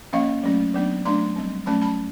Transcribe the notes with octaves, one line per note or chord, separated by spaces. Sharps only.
F3 A#3 C#4 D#5 F5
F#3 A3 C#4
F#3 B3 D4
F#3 A3 D4 A#5 C6
G3 C4
F#3 A3 C#4 A5 B5
A5 B5